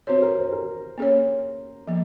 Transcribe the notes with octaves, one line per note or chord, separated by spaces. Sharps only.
C4 F#4 C5 C#5
A#4
C5
A#4
A#3 C#4 G#4 C#5
F3 A#3